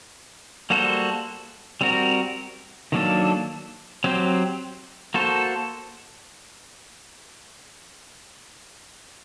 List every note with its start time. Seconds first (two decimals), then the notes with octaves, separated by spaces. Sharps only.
0.70 G3 A#3 F#4 A4 C5
1.81 G3 C4 F#4 A#4
2.92 D#3 F#3 A#3 D4 A4
4.04 F#3 C4 G4 C5
5.14 A#3 F#4 A4 C5